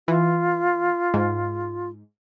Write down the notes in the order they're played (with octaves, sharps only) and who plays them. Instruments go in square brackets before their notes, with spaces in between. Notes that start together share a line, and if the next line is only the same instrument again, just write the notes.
[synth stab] E3 [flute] F4
[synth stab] G#2